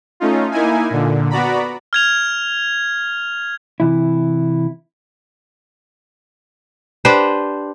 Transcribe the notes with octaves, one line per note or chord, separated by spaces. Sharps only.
A3 C#4 D#4 F4
A#3 D#4 E4 G#5
A#2 D3
B3 F#4 D5 A#5 B5
F6 G#6 F7
C3 E3 E4
D4 G4 B4 C5